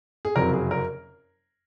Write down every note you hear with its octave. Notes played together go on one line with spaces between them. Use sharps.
G#4
F#1 F2 C3 F#3 A#4
G#4
A#4